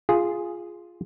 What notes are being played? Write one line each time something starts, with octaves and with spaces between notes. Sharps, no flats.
F4 G#4